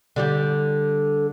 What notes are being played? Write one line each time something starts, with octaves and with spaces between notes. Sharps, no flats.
D3 G3 G4